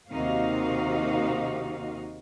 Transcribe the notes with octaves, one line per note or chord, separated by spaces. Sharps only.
D#2 C3 D#3 D#4 F#4 F5